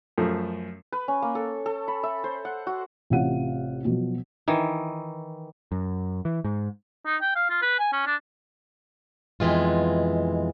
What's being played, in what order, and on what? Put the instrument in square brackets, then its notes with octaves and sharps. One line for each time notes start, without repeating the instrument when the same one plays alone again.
[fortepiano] F#2 F3 A3
[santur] B4
C#4
A#3
A4
A4
B5
E5
C5
F#5
F#4
[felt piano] A1 C3 F4 F5 F#5 D#7
B2 F3 F#3
[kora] D#3 E3
[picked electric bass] F#2
E3
G#2
[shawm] D#4
G5
F5
F4
B4
G#5
C#4
D4
[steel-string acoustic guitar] F2 B2 E3 G#3 F4